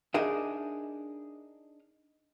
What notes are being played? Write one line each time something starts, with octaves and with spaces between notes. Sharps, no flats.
D4 D#4 G#4 A#4 E5